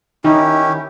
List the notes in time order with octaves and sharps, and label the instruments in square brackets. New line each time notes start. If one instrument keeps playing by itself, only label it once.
[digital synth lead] D#3 [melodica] C#4 E4 G4